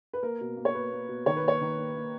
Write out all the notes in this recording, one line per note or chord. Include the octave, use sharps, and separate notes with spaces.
B4
A#3 A#4
B2
A#3
C#5
A#3 B4
A#3
B2
D#3 C#5
B4
A#3 C#5
D#3
A#3
A#3